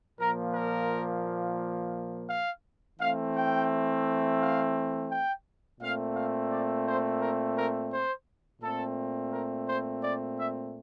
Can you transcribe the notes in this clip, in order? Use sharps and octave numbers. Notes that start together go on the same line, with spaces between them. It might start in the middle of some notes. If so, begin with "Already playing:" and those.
A#2 F3 A#3 A#4
A#4
F5
E3 A3 C4 F5
G5
F5
G5
A#2 A3 C4 F5
F5
D5
C5
A#4
A#4
C5
A#2 A3 C4 A4
A#4
C5
D5
E5